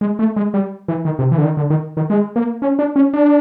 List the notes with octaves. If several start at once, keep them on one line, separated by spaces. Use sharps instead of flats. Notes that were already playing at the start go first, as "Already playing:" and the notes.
G#3
A3
G#3
G3
E3
D#3
C3
E3
D3
D#3
D3
D#3
D#3
G#3
A#3
C#4
D4
C#4
D4